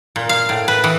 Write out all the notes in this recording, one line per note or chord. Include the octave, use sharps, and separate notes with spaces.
A#2
F5
A2
B4
E3